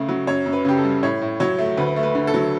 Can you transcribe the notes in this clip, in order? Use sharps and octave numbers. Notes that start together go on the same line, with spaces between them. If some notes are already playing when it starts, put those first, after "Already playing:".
Already playing: C#2 C#3 A3
F#3
F#2 C#5
F#2
B4
C#3 G4
A4
G3
A2 C#5
A2
F#3 C#5
A3
D2 B4
A3
B4
D3
A4
F#3